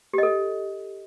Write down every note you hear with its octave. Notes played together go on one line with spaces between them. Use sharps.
G4 A4 D#5